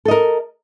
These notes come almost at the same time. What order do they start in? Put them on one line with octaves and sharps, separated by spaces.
A4 D#5 A#4